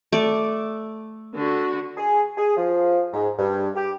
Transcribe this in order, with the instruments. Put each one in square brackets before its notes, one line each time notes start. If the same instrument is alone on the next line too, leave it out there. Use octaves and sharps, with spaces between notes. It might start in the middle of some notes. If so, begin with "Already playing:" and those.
[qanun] A3 D5
[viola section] D3 F#4
[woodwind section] G#4
G#4
F3
G#2
G2
G4